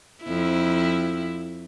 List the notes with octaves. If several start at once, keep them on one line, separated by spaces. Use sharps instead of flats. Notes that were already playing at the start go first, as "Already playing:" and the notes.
F2 E4